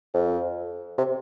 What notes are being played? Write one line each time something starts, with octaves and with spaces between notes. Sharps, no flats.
F2
C3